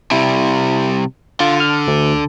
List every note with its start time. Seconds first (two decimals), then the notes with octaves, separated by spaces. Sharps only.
0.11 C3 G3 E4
1.40 D3 F4
1.60 F6
1.87 D2